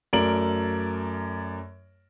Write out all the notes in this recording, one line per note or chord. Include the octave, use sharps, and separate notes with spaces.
F#2 A3 A#4 D5 D7 F#7